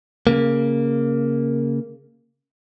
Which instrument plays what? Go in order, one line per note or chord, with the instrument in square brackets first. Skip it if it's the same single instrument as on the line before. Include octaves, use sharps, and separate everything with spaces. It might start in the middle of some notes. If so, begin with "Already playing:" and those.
[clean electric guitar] C#3 A#3